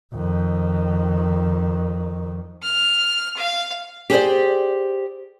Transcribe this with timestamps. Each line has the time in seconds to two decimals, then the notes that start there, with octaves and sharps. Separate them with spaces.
0.14 F2 D#3
2.63 F6
3.37 F5
4.10 G4 G#4 B4 C5 D5